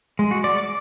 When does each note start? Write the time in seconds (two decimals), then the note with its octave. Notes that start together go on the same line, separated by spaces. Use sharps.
0.19 G#3
0.31 F#4
0.44 D5
0.58 D6